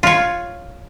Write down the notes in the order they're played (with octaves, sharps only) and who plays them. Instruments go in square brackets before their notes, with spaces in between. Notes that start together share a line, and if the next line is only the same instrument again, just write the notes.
[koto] F4 C#5